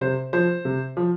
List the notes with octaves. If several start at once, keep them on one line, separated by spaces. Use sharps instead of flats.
C3 C5
F3 C5
C3
F3